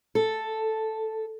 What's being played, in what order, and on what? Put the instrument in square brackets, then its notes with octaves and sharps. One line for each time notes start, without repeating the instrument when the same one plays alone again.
[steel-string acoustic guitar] A4